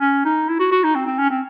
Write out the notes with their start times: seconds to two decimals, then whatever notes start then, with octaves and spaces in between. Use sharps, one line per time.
0.01 C#4
0.25 D#4
0.49 E4
0.60 F#4
0.72 F#4
0.84 D#4
0.96 C4
1.07 C4
1.19 C#4
1.30 C4